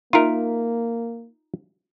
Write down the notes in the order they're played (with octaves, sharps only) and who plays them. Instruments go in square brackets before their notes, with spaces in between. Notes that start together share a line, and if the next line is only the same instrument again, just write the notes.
[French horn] A#3 [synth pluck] D#4 E5 [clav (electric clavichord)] F4 A#4